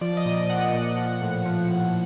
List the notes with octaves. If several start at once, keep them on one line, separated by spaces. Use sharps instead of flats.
F3 D5
D#5
A#2
F3 F#5
A#2
F3
A2
F3
A2